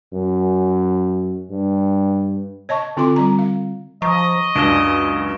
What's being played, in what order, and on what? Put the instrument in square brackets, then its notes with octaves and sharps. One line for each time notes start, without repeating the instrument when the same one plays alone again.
[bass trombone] F#2
G2
[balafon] C#5 D#5 A5 C#6
D3 C4 F4 A4 C6 D6
G3 A#5
F5
[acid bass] F3 [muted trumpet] D#5 [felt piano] A#5 [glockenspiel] C#6
[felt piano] C#2 F#2 [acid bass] D4 [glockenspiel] D7 E7 G7